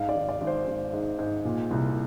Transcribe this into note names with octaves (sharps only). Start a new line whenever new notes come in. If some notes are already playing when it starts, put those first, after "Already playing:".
Already playing: G#2 F5
D5
G#1
D5
G#1
C5
G#1
G#2
G#2
A#2
C2